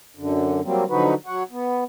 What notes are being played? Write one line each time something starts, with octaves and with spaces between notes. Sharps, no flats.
F#2 D3
F#3 G3 A#3 C4
D3 F3 F#3 D#4 F#4 B4
F#3 C#5 F#5
B3